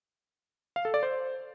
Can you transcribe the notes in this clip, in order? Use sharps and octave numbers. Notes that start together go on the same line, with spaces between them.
F5
A4
D5
C5